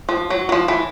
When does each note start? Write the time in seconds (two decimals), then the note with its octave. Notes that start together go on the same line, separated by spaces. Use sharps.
0.09 F3
0.30 F#3
0.49 F#3
0.52 F3
0.68 E3